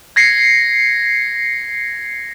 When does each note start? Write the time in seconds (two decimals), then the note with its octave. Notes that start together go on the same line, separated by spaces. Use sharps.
0.16 G#6 A#6 C7 C#7